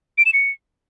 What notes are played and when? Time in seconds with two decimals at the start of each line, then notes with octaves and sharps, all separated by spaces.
0.18 D7
0.26 E7
0.33 C#7